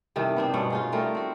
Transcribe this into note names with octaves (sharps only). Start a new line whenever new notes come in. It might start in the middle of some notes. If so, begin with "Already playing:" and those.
G2 C3 D#3 E3
B3 C4 D4
G2 B2 C#4 F#5
G#3 D#4 F4
G3 A3 A#4
C4 F#4